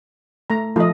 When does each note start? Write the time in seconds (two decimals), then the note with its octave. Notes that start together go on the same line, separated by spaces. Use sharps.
0.50 A3 A#5
0.76 F3 A3 D#5